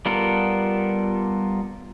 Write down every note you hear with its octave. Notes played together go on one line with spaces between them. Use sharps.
G3 B3 F4 A4 A#4